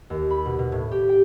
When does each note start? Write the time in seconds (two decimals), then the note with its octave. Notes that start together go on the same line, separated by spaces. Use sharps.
0.10 D#2
0.30 B5
0.46 B2
0.59 B2
0.72 A2
0.91 G4
1.09 G5